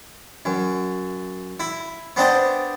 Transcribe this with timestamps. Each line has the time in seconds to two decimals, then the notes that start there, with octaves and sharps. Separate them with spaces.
0.45 F#2
1.60 E4
2.16 B3 C4 D4 D#5 A5